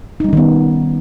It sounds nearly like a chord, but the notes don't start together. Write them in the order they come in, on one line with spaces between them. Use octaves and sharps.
D#4 G3 C#4 D#3 B3